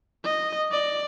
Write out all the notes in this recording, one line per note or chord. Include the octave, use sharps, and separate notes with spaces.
D#5
D5